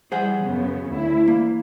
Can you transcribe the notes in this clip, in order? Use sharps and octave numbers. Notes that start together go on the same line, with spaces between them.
E3 G3 G#4 C5 F#5
F#2 C#3 B3
D2 E4
E3 A#3